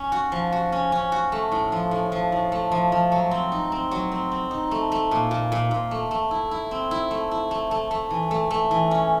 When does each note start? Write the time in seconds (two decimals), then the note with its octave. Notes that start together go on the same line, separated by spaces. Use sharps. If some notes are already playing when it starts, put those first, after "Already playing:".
Already playing: C#4
0.12 F#4
0.32 F3
0.52 F#4
0.72 C#4
0.92 C#4
1.12 F#4
1.32 A3
1.52 A2
1.72 F3
1.91 A2
2.12 F3
2.32 A2
2.52 A3
2.72 F3
2.92 F3
3.12 F#3
3.31 C4
3.52 D#4
3.72 C4
3.91 F#3
4.12 C4
4.32 C4
4.51 D#4
4.71 A3
4.92 A3
5.11 A#2
5.31 A#2
5.52 A#2
5.71 A#2
5.91 A3
6.11 A3
6.31 E4
6.51 E4
6.71 C4
6.91 E4
7.11 A3
7.31 E4
7.51 A3
7.71 A3
7.91 A3
8.11 E3
8.31 A3
8.51 A3
8.71 E3
8.91 C#4